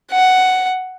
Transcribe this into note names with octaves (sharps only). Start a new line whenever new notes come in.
F#5